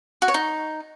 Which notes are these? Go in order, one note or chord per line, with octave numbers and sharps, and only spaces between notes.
F#4
C#5
D#4